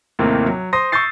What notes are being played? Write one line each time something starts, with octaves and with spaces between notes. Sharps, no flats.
D#2 A2 C3 A#3 C4
F#3
C5 C6 D#6 A#6
C#6 D#6 E6 G6 A6 C7